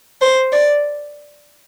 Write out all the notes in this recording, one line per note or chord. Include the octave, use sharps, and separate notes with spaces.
C5
D5